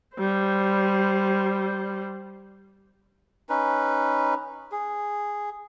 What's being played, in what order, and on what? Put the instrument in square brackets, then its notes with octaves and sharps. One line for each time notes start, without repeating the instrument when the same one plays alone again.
[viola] G3 C5
[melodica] C#4 D#4 B4
G#4